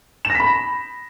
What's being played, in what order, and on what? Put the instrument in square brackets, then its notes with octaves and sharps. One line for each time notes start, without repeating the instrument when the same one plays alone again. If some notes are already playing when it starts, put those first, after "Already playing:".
[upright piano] E7
A#6
B6
B5